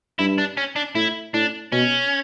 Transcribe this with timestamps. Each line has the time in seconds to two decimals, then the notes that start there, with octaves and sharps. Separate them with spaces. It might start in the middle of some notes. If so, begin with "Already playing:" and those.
0.19 G2 E4
0.38 D4
0.57 C#4
0.76 D4
0.95 A2 E4
1.34 A2 D4
1.72 B2 C#4